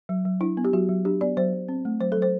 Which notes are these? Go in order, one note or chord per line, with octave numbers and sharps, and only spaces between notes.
F#3
F#3
D4 E4
B3
G4
F#3 F#4
F#3
D4 G4
B3 D5
F#3 C5
F#3
C4
A3
F#3 C5
A4
F#3
C5